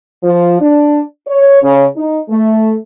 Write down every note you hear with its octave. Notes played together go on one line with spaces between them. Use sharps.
F3
D4
C#5
C#3
D#4
A3